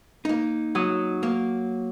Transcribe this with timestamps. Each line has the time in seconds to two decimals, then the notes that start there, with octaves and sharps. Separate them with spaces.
0.25 A#3 D#4
0.75 F#3 D#6
1.23 A#3